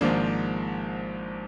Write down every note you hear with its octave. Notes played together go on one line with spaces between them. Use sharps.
G#1 G#2 F3 A#3 D4